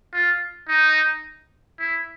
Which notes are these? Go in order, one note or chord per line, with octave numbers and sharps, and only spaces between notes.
F4
D#4
E4